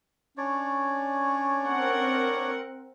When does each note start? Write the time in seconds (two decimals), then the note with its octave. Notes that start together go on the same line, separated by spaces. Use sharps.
0.37 C#4 D4 C#5 D5
1.68 C4 A#4 F#5